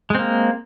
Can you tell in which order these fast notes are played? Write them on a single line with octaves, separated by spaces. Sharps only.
G#3 C4 A#3